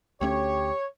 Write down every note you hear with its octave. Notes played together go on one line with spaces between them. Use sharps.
D2 A3 C#4 G4 C#5